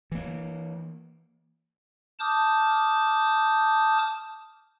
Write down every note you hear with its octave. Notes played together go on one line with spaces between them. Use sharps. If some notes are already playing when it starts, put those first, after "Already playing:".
E3 A#3
A5 D6 D#6 F6 G6